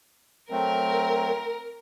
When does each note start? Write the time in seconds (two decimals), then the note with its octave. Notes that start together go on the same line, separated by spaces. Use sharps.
0.51 F#3 A3 C4 A#4